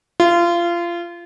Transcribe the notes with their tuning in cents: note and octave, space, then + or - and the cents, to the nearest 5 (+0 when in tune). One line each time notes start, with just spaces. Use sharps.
F4 -25